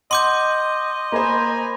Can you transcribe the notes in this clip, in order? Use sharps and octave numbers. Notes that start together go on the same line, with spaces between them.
D#5 F#5 C6 D6 G6
A#3 C5 G#5 A#5 B5